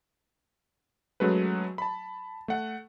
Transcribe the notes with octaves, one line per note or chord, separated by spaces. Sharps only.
F#3 G#3 A3 C#4 B4
A5 B5
A3 F#5